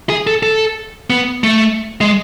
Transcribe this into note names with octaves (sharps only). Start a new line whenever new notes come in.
G#4
A4
A4
B3
A3
G#3